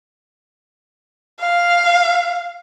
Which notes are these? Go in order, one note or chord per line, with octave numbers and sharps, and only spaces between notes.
F5